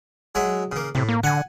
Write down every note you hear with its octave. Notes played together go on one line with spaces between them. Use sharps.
F#3 G#3 E5
C#3 A#3
A2 C3
A#3
D3 F#5 G#5